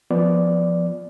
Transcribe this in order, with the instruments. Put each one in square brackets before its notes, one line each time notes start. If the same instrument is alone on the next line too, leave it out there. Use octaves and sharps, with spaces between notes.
[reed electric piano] F3 B3 D5